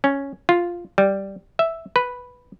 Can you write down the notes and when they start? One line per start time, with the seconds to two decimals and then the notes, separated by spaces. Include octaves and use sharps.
0.04 C#4
0.49 F4
0.98 G3
1.59 E5
1.96 B4